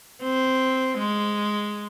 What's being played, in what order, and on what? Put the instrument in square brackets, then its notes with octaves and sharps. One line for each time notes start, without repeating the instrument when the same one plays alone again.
[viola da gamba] C4
G#3